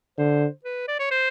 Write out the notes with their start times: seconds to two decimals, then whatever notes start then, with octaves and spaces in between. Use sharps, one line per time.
0.18 D3 C5
0.64 B4
0.88 D5
0.99 C#5
1.11 C5